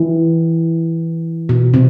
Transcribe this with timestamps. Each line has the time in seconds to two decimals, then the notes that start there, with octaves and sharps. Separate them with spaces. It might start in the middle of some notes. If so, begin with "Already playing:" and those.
Already playing: E3
1.49 B2
1.74 C3